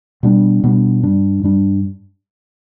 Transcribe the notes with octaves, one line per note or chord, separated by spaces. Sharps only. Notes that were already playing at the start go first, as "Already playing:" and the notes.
B2 G3 B3 D4
B2 G3 B3 D4
G2 G3 D4
G2 G3 D4